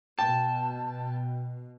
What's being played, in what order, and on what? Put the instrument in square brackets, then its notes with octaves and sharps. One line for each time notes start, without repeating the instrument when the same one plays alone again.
[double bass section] B2 [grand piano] G5 [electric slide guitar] A5